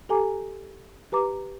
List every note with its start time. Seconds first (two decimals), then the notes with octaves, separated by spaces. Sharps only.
0.09 G4 A4 G#5 A#5 D6
1.12 G4 B4 A#5 D6